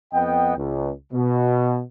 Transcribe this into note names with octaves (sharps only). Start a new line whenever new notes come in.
F2 B3 D#5 F#5 G5
C#2
B2